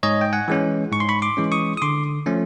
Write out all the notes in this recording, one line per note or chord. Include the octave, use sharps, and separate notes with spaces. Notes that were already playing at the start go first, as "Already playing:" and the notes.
G#2 C#5 D#5
G5
F#5 G#5
E3 G#3 C#4
G#2 C#6
C6
B5 C#6
C6 D6
E3 G#3 C#4
C#6 D#6
D#6
D3 C6 D6
F3 A3 C#4